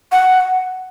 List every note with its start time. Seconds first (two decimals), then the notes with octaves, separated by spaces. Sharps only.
0.12 F#5